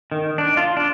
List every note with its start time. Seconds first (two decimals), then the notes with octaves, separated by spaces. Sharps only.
0.12 D#3
0.38 D4
0.57 F4
0.77 D4